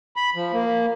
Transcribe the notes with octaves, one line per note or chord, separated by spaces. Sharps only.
B5
F3
A#3